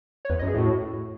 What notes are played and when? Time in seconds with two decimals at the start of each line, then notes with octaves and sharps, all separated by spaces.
0.25 C#5
0.30 E2 B4
0.39 D#5
0.42 F#2
0.48 G#4
0.54 A2 F#4